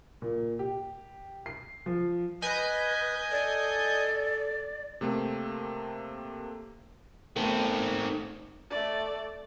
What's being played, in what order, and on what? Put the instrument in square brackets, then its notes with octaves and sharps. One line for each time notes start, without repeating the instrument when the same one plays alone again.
[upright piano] A#2
G4
C7
F3
[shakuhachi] B4 [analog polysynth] D#5 G#5 G6
[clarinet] A4 [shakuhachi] D5
[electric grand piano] C3 A3 A#3 C4
[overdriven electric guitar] D#3 C4 [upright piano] A3 B3
[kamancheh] A3 D5